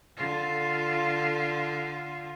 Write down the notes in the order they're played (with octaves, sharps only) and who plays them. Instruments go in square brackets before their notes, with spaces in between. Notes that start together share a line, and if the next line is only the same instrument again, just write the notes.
[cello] D3 F4